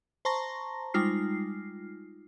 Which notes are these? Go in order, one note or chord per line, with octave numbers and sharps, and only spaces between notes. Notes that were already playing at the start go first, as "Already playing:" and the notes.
C5 A5 A#5 C6 C#6 A#6
G3 G#3 D#4 F4 F6 C7